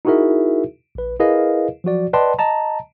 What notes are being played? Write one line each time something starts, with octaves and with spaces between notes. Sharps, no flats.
D#4 E4 F#4 G#4 A#4 E5
A#1 B4
E4 G#4 A#4 B4 D#5 F5
F3 F#3 F#4 D5
B4 D5 D#5 G5 A5 C6
D#5 A5 A#5